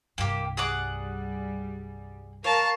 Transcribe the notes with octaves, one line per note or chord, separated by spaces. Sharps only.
C2 G2 A#3 G4
G3 G#4 F#5 D6
A#4 C#5 F5 A5